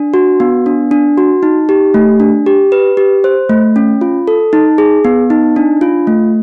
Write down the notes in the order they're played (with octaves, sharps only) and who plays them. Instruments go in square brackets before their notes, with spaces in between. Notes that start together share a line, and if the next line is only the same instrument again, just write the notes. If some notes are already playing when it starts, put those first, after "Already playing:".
Already playing: [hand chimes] D4
F#4
B3
D4
D4
F#4
D#4
G4
A3
D4
G4
B4
G4
C5
A3
C#4
F4
A4
D#4
G#4
B3
D#4
D4
F4
A3